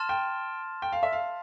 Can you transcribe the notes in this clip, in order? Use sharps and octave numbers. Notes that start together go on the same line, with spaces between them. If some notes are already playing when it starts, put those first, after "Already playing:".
Already playing: A5 C6 F6 A6 E7
G5
G5
F5
E5
F5